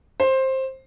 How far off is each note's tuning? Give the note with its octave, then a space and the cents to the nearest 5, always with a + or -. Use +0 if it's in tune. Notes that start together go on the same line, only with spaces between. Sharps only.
C5 +15